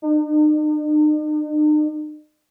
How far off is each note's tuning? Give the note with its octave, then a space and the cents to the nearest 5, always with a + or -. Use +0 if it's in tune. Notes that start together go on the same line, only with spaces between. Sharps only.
D#4 -45